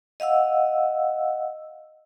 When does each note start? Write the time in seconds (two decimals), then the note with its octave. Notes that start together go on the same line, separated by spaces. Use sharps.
0.20 D#5 F5 F#5 E6